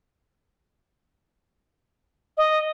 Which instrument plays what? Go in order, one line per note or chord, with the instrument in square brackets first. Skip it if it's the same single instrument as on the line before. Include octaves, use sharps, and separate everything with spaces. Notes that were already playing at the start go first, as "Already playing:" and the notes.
[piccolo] D#5